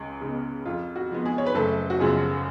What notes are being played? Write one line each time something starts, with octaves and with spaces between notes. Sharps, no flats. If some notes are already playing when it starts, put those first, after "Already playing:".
Already playing: C#2 G#3 G#4
C#3 G#3 B3
F2 F4
F#4
F3 G#3 B3
G#3 G#4
C#5
B4
F#1 A3 A4
F#4
F#2 C#3 F3 G#3 G#4